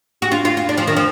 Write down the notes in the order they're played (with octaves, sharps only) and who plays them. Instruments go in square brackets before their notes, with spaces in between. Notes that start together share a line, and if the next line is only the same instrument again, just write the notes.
[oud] F#4
[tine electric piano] D4 [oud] F4
[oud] F4
F4
D4
F3
D#3
[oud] F3 [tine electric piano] D4